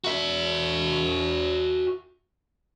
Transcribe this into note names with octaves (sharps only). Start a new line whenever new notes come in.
F#4 E5